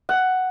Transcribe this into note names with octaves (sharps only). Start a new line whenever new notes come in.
F#5